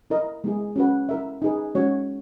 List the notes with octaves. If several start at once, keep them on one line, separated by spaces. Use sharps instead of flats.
E4 A#4 D#5
G#3 B3 E4 G#4
C#4 F#4 B4 F#5
E4 A#4 E5
D#4 G#4 B4
G#3 C#4 F#4 C#5